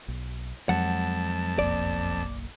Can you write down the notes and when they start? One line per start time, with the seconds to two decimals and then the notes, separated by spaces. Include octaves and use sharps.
0.08 B1
0.69 F2 F#3 G#3 F#5 A5
1.59 F#1 B1 A#3 D5